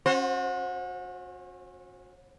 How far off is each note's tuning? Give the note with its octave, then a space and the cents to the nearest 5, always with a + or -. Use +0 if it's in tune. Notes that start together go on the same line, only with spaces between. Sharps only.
C#4 -30 F#4 -30 C5 +20